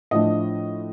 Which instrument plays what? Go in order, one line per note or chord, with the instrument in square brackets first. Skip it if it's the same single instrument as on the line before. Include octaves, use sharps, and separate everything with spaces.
[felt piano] A2 F3 A3 D4 D#5